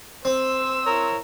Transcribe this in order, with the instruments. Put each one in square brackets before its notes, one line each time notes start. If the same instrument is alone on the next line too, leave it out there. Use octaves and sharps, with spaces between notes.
[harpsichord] C4 [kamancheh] C5 E6
[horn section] E4 A#4 C#5